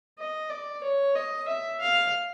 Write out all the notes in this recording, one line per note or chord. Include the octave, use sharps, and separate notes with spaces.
D#5
D5
C#5
D#5
E5
F5